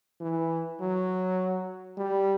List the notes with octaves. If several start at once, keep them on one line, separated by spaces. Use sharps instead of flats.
E3
F#3
G3